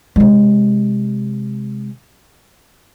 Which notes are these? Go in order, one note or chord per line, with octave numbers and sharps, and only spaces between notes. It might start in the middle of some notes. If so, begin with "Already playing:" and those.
C3 G#3